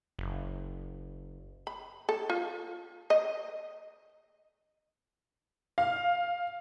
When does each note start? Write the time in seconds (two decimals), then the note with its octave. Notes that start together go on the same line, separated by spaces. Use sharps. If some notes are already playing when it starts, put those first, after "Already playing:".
0.19 F#1
1.67 B5
2.09 A4
2.30 F4
3.10 D#5
5.78 F5